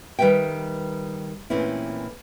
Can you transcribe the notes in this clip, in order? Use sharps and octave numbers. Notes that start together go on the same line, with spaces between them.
D#3 G3 C4 B4 E5 G5
A#2 E3 A3 C4 C#4 E4